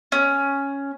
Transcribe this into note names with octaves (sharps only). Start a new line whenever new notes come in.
C#4